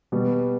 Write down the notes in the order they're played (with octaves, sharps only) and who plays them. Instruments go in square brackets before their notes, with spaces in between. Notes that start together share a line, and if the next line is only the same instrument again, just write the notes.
[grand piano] B2 G3 B3